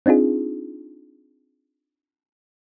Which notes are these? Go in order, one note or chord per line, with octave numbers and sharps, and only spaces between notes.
C4 D4 D#4 F4 G#4